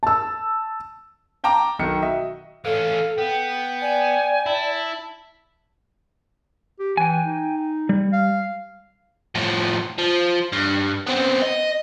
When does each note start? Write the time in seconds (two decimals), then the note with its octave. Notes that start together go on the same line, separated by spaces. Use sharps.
0.03 A5 E6
1.44 F5 G5 A5 A#5 D6
1.79 B1 D#3 C#7
2.02 F#4 D#5 E5
2.65 E3 C#4 A4 F5
3.18 B3 G5
3.82 D5 G#5
4.46 E4 A5
6.79 G4
6.97 E3 G5 G#5
7.25 D#4
7.89 G3
8.12 F5
9.35 A2 F3
9.98 F3
10.52 G2
11.07 B3 C4
11.42 D#5